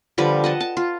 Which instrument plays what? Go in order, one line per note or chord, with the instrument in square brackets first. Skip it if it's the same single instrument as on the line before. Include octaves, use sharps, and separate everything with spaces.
[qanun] D3 F3 G3 B4
D#5 F#5 A5
A5
F4